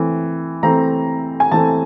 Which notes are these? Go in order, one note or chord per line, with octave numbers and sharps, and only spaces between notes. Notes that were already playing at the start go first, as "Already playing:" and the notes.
Already playing: E3 A3 C4
E3 A3 C4 A#5
G#5
E3 A3 C4 A5